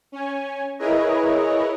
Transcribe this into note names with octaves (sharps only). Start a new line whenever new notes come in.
C#4 G#5
E4 G#4 A#4 B4 C#5 D#5